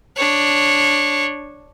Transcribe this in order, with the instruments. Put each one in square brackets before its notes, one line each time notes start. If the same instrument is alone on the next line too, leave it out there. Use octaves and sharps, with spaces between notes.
[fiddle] D4 C#5